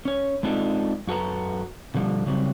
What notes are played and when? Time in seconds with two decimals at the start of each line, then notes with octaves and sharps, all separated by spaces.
0.05 C#4 C#5
0.43 G#3 C4 D4 D#4 F4 A4
1.07 F#2 F#4 A4 B4 A#5
1.94 B2 D3 F3 G3
2.26 C#3 F#3 G3 C4